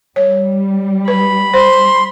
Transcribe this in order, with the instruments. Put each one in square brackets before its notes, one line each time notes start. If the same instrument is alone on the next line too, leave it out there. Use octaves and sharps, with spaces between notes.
[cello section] G3 [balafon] C#5
[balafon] B4 [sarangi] B5
[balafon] C5 [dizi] C6